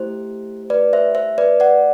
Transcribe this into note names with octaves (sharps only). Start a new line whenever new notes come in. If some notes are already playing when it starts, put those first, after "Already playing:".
Already playing: A3 E4 G4 C5
B4 D5
C5 E5
C5 E5
B4 D5
D5 F#5